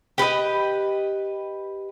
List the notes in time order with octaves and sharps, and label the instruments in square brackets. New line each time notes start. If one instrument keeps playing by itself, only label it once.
[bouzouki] G4 B4 D5 D#5